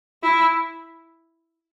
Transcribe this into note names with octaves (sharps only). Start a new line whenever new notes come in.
E4